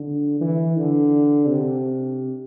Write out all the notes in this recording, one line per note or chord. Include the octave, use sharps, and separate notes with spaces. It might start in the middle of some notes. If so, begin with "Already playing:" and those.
Already playing: D3
E3
D3
C3